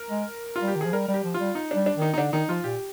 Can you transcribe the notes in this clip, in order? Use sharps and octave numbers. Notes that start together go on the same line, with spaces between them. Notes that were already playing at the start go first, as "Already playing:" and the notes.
Already playing: A#4
G#3
F4
G3
G4
D#3
F3 G#4
G3 A#4
G3
G4
F3
F4
G3
D#4
G3 D4
D4
D#3
D#4
D#4
D3 D4
D#3 D#4
F3 F4
A#2 G4